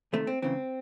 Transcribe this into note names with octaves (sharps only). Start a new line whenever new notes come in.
C2 C3 D#3 A3
C4
C#2 C#3 E3 C4